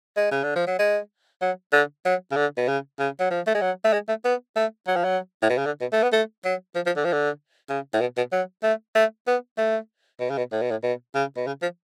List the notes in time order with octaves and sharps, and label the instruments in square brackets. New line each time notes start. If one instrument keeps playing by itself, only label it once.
[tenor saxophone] G#3
C#3
D3
F3
F#3
G#3
F#3
D3
F#3
C#3
D3
B2
C#3
C#3
F#3
F3
A3
G#3
F#3
A3
G#3
A3
B3
A3
F#3
F3
F#3
A2
B2
C#3
D3
B2
A3
B3
A3
F#3
F3
F3
D3
F3
D3
C#3
A2
B2
B2
F#3
A3
A3
B3
A3
B2
C#3
B2
A2
B2
A2
B2
C#3
B2
C#3
F3